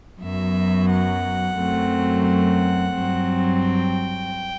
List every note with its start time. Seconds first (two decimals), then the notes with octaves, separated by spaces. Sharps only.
0.21 F#2 F#3 B3 E5
0.89 F#5
1.57 F#2 F#3 A3 C4
2.27 F#5
2.94 G2 F#3 C4
3.63 G5